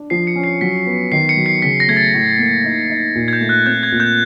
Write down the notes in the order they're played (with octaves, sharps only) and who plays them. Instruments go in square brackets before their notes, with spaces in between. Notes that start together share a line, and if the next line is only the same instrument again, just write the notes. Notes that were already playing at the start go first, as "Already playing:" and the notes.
Already playing: [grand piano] D4
[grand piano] F3 [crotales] C7
[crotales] C#7
[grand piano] C#4
[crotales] C7
[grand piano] F#3 [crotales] B6
[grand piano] B3
[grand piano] D#3 [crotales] C7
[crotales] C#7
[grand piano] F#3
[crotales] C7
[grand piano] C#3 [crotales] B6
[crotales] A#6
[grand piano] A3 [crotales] G#6
[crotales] A6
[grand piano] A2
A#3
D#4
D#4
A#2
[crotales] G#6
G6
[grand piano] A3
[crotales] F#6
[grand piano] C4 [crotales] G6
[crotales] G#6
[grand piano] A#2
[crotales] G6